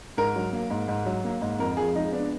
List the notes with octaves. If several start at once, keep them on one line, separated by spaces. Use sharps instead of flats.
G#2 A#4
F#3
A#3
G#2
G#2
F#3
A#3
G#2
F2 A#4
F3 G#4
G#3 D#4
B3 D4